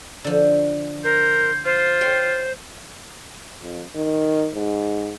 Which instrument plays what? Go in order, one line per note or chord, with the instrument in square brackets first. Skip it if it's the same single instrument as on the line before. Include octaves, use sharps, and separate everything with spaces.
[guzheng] D3 F3
[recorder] A#4 [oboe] C5
[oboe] F4 [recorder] C5
[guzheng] C#5 G5 C6
[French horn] F2
D#3
G#2